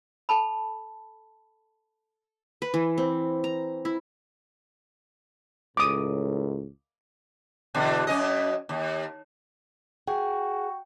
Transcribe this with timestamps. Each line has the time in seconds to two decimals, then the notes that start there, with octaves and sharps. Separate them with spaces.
0.29 A4 A5 B5
2.62 B4
2.74 E3
2.98 C4
3.44 A#5
3.85 E4
5.77 C#2 A2 D6 D#6
7.74 E2 B2 D3
8.07 F#2 C#4 D#5
8.69 D#2
10.08 F#4 G#4 G5 G#5